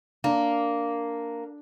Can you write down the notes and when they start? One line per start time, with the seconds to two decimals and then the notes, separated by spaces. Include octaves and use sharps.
0.24 A#3 D4